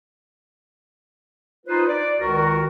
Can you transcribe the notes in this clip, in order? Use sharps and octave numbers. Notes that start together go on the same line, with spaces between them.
D#4 F4 B4 C5
D5
C#2 D#3 F#4 A#4